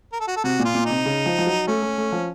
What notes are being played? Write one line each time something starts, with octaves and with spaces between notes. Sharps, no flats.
A#4
A4
F#4
A4
C3 F#4
A#2
F4
A#2
C3 D#4
C#3
F3
F3
F#3
A3 C#4
A3
A3
F3